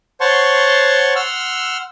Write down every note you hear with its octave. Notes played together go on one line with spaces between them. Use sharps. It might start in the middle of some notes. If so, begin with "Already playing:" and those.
C5 C#5 F#5 A5 C6 C#6
F#5 C6 E6 F6